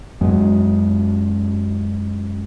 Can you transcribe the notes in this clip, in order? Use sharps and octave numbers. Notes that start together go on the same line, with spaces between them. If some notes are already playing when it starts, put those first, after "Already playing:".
F#2 F#3 G#3